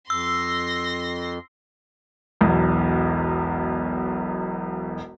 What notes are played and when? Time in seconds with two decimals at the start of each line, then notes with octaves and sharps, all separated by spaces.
0.10 F2 C6 E6 A#6
2.41 E1 B1 E2